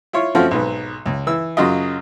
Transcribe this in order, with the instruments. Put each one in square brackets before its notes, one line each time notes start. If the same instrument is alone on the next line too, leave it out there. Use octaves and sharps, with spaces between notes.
[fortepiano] E4 F4 C#5
F3 A3 C4 C#4 F4 F#4
B1 G#2 B3
C#2
E3 E6
F#2 C#3 F#3 F4 D#5